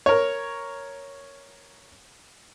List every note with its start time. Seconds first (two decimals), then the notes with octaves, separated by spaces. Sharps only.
0.06 A#4 C#5